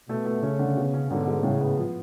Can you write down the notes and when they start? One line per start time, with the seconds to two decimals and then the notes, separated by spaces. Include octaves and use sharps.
0.09 B2 A3
0.26 A3
0.42 C#3 C#4
0.59 D3
0.77 B2
0.94 C#4
1.10 G#2 B2 D3
1.27 G#3
1.43 A2 C#3
1.60 B3
1.77 F3